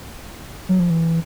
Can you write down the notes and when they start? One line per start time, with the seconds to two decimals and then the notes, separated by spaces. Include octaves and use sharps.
0.69 F#3
0.80 F3
0.90 E3